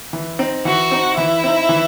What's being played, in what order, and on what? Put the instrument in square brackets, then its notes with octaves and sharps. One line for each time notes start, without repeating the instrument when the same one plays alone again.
[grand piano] E3
C4 D#4
[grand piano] E3 [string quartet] F#4
[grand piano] C4 D#4
[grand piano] E3 [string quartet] E4
[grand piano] C4 D#4
E3